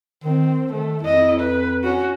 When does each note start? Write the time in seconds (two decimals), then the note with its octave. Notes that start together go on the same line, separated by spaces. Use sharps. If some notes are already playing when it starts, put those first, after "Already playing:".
0.24 D#3 C4
0.73 D#3 A3
1.03 F2 E4 D#5
1.40 B4
1.84 C#4 F#4